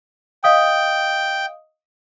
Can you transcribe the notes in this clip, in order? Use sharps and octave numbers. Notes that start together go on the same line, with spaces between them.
D#5 F5 G5 D#6